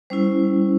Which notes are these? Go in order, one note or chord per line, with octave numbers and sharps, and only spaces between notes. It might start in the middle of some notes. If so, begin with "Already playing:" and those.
G3 C#4 E4 C5